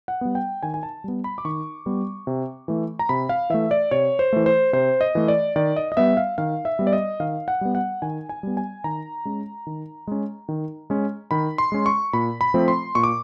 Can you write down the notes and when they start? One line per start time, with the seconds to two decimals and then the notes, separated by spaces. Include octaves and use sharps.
0.08 F#5
0.21 G3 B3
0.35 G5
0.63 D#3 G#5
0.74 G#5
0.83 A5
1.04 G3 B3
1.24 B5
1.38 D6
1.45 D#3 C#6
1.86 G3 B3
2.27 C3
2.68 E3 A3
2.99 A#5
3.09 C3 B5
3.29 F5
3.50 E3 A3 E5
3.71 D5
3.91 C3 C#5
4.19 C5
4.33 E3 A3
4.46 C5
4.73 C3 C5
5.01 D#5
5.15 E3 A3
5.28 D5
5.56 D#3 D5
5.76 D#5
5.92 D#5
5.97 G3 B3 E5
6.17 F5
6.38 D#3 F5
6.65 E5
6.79 G3 B3
6.87 D5
6.93 D#5
7.20 D#3 F5
7.48 F#5
7.61 G3 B3
7.75 F#5
8.02 D#3 G#5
8.29 G#5
8.43 G3 B3
8.57 G#5
8.84 D#3 A#5
9.25 G#3 C#4
9.67 D#3
10.07 G#3 C#4
10.49 D#3
10.90 G#3 C#4
11.31 D#3 B5
11.58 C6
11.72 G#3 C#4
11.86 C#6
12.13 A#2 B5
12.41 B5
12.54 F3 A3 C4
12.68 C6
12.95 A#2 C#6
13.03 D6